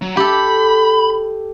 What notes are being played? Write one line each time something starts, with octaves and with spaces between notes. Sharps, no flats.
F#3
G4 A4 B5